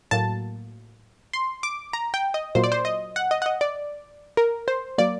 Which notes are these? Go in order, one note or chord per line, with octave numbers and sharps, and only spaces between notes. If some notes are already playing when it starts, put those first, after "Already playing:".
A2 F#3 A#3 A5
C6
D6
A#5
G5
D#5
A#2 F#3 A#3 C5
D5
C5
D#5
F#5
D#5
F#5
D#5
D5
A#4
C5
F#3 A#3 D5